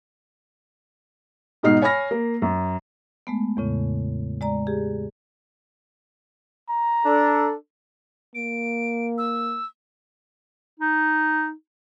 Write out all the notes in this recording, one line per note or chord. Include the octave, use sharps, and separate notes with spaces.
G#2 B2 G#3 D#4 F6 C7
C#5 G#5 B5 F6 A#6
A#3
F#2
G#3 A3 B3
E2 A2 C#3
G#3 D5 A#5
G4 G#4
A#5
D4 A4
A#3 D7
E6
D#4